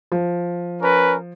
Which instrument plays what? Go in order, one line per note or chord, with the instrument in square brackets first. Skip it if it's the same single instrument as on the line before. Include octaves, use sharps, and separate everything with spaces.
[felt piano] F3
[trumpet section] C#4 A#4 B4